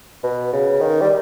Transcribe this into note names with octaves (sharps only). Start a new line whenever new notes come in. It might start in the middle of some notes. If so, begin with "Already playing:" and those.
B2
C#3
D#3
G3